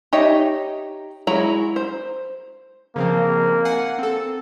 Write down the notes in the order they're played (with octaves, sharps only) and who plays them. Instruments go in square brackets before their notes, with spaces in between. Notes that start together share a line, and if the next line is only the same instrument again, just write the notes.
[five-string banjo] D#4 G4 C#5 D#5 E5
F#3 G#3 E4 C#5 A#5
C5
[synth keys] C#3 F3 C4 [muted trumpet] A#3
[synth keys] F#5 G#5 C7
C4 A4